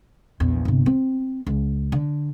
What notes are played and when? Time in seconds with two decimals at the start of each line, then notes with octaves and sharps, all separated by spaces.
0.40 A#1 E2
0.65 G1 C3
0.86 C4
1.47 C#2
1.92 D3